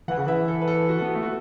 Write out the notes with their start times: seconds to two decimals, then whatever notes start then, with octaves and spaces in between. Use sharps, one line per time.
0.08 E3 F#5
0.17 C#3
0.27 E3 E5
0.48 A4
0.61 B4
0.68 A4
0.89 F#4
0.99 B3 A4
1.15 A3
1.23 F#4